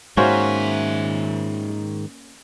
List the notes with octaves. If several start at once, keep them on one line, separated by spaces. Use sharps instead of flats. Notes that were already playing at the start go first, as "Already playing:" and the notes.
G#2 D#3 A#3 C#4 F#4 C5 C#5 E5